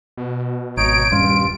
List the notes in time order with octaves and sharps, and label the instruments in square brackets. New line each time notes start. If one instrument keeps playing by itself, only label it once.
[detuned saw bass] B2
[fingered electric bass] G#1 [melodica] D#4 C#5 [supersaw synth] D7
[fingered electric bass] D#1 G3 C#4 [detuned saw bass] G2 [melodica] F4